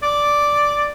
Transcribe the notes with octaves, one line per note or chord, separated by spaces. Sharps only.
D5